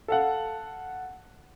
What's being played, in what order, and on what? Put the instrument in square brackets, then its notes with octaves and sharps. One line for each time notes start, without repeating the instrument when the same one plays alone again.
[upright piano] A4 F5 F#5